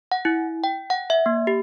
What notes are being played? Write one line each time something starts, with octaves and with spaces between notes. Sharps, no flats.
F#5
E4
G5
F#5
E5
A#3
G4